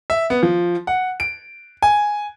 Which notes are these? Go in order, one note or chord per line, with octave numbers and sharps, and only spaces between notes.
E5
B3
F3
F#5
D7
G#5